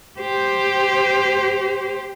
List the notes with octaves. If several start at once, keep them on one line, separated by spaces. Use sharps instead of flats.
G4 C5